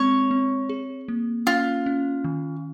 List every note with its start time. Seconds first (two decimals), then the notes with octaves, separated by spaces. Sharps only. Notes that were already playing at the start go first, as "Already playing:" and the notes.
Already playing: G#3 C4 C#5
0.31 C4
0.69 G#4
1.08 A#3
1.47 C#4 F4
1.86 C#4
2.24 D#3